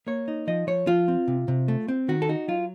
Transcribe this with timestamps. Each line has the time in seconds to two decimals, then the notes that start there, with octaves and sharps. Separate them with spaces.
0.07 A#3 C#5
0.28 D#4
0.47 F3 D#5
0.67 F3 C#5
0.87 F3 F4
1.08 C4
1.28 C3
1.48 C3
1.68 A3
1.88 C4
2.08 D#3 F#4
2.22 A4
2.29 D#4 F#4
2.48 F#3 F4